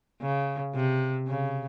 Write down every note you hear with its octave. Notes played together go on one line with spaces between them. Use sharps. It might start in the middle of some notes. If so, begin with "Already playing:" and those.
C#3
C3
C#3